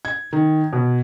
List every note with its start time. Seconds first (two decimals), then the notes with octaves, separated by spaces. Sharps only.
0.05 G#6
0.33 D#3
0.73 B2